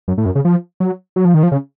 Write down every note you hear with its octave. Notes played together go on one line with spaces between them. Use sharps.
F#2
A2
F#2
C#3
F3
F#3
F#3
F3
D#3
F3
C#3